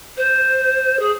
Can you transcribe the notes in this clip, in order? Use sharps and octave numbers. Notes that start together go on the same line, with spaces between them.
C5
G#4